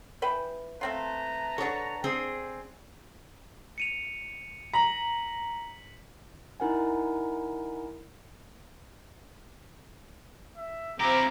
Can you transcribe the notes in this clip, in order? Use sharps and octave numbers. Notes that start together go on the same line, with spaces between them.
E3 B4 G5
A3 C4 F4 B4 A5 A#5
D3 A4 C#5 C#6
C4 G#4
C#7 D#7 F7
A#5 B6 F#7
D#4 E4 A#4 F#5 G#5
E5
C4 E4 F4 G4 A#5 D6